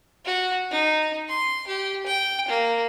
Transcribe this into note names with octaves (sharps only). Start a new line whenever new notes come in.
F#4
D#4
C6
G4
G5
A#3